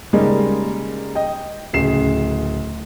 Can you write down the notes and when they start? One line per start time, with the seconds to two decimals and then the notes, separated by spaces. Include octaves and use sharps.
0.13 C#3 G3 G#3 A#3 C#4 D#4
1.15 D#5 G5
1.73 D1 C#3 C7 E7